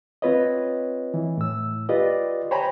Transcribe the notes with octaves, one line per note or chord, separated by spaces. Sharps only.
C4 F4 B4 C#5 D#5
E3
A2 E6
F4 G4 B4 D5 D#5
C5 C#5 G5 G#5 A#5 B5